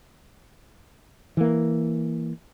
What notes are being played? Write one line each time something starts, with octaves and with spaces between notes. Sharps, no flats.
E3 A#3